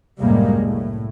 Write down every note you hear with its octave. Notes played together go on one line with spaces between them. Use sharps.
C2 F#2 A2 G3 G#3 A#3
A2